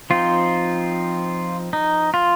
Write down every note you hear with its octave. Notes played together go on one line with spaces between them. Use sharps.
F3 C4 D#4 F4
D#4
F4